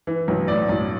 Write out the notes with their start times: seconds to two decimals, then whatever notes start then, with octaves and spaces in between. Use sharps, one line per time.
0.07 E3
0.28 B1
0.48 A2 D5
0.69 B1